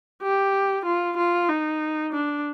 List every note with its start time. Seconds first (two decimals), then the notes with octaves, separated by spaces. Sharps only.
0.22 G4
0.85 F4
1.17 F4
1.49 D#4
2.13 D4